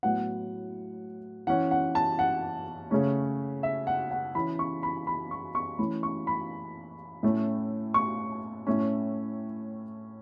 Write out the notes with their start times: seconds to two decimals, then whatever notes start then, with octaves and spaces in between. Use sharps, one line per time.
0.03 A2 F#3 B3 F#5
1.47 E3 C#4 F#5
1.71 F#5
1.95 A5
2.19 F#5
2.91 C#3 A3 C#4
3.63 E5
3.87 F#5
4.11 F#5
4.35 E3 C#4 B5
4.59 C#6
4.83 B5
5.07 B5
5.31 C#6
5.55 C#6
5.79 E3 A3 C#4 B5
6.03 C#6
6.27 B5
7.23 A2 A3 C#4
7.94 C#6
8.67 A2 A3 C#4